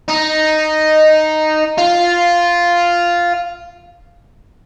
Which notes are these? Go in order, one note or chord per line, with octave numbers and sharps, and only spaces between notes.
D#4
F4